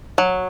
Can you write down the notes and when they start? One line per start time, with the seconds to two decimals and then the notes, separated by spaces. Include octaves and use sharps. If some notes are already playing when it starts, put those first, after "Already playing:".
0.18 F#3